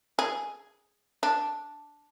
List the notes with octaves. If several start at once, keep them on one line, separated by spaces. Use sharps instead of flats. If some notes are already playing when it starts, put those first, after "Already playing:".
G#4
D4